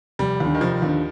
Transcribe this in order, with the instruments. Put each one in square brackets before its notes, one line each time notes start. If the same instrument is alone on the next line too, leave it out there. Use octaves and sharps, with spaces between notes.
[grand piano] F1 [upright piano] G3
[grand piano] D#2 D3
[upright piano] D#3
[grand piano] F1 [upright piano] F3
[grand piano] D#2 D3